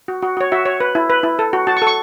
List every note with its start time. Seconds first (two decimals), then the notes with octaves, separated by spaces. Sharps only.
0.08 F#4
0.22 F#4
0.37 F#4 C#5
0.52 F#4 E5
0.66 C#5
0.80 B4
0.95 E4
1.10 B4
1.23 E4
1.39 A4
1.53 F#4
1.67 F#4 A5
1.77 C#6
1.82 A4
1.87 C#6